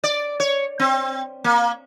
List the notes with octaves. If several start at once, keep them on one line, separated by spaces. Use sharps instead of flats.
D5
C#5
C4
A#3